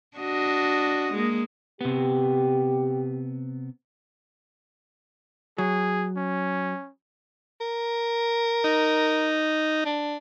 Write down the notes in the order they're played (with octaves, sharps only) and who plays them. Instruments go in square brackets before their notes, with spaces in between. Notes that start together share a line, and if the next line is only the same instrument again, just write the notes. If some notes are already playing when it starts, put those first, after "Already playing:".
[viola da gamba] D4 F#4 D#5
G#3 A#3
[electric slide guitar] C3 B3 [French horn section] G4
[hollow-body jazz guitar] F#3 [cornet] G#4
[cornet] C#4
[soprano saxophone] A#4
[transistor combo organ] D#4
[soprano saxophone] D4